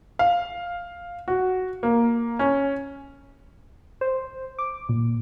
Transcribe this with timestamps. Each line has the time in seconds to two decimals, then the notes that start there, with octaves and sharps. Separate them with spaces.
0.19 F5
1.28 F#4
1.83 A#3
2.39 C#4
4.01 C5
4.59 D6
4.89 A#2